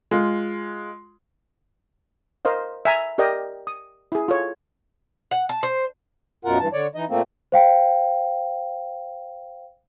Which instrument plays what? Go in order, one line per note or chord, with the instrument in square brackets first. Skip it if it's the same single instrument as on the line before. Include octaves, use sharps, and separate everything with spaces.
[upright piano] G#3 F4
[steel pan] A#4 C5 D#5 F5
E5 G#5 A#5
G4 A#4 D5 D#5 G5
D#6
E4 G#4
F4 A4 C#5
[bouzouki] F#5
A5
C5
[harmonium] F#2 B2 F4 A#4 F#5
G2 E3 A5
D3 C#5 D5
E3 D#4 D#5
A#2 A3 A#3 C4
[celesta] C5 F5 G5